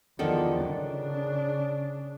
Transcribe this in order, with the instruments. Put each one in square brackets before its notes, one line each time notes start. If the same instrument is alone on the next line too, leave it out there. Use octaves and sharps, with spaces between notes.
[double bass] E2 F3 [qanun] D3 D#3 A4
[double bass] C#3 D4